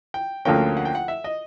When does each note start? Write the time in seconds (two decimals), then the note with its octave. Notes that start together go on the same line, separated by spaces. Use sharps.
0.14 G5
0.45 D2 D3 F3 A#3 C#4 G5
0.77 F#5
0.85 G5
0.95 F#5
1.08 E5
1.24 D#5